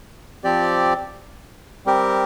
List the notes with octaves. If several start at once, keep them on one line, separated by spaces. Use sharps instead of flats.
F3 C4 G4 D5
G3 C4 G4 A#4